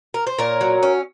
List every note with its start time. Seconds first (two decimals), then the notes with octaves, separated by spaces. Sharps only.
0.14 A#4
0.27 C5
0.39 A#2 A#4 C#5
0.61 F#3
0.83 C#4